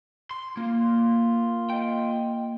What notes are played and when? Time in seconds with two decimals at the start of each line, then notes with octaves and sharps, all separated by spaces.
0.31 C6
0.57 A#3 F4
1.70 D#5 G5